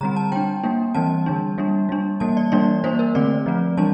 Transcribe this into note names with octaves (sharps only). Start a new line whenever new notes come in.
D3 G3 C4 A#5
A5
G3 D4 G5
G3 A#3 D4
E3 G3 C4 A5
D3 G3 D4
G3 A#3 D4
G3 D4
E3 G3 A#3 A5
D5
E3 G3 A#3 D4 D5
G3 A#3 D4 C5
A#4
D3 A3 C4 D5
F3 A3 C4
E3 G3 D4 A5